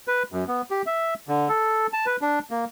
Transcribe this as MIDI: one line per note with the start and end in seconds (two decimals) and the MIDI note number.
0.08 0.23 71
0.32 0.44 42
0.48 0.62 59
0.71 0.82 67
0.86 1.14 76
1.28 1.49 50
1.49 1.87 69
1.93 2.06 81
2.06 2.16 71
2.22 2.39 62
2.51 2.65 58